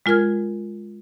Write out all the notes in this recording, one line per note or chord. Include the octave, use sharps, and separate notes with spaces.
G#3 F4 A#4 F6 G#6